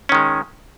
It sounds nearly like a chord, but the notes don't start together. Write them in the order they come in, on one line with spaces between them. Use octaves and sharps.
C#4 D#3 G#3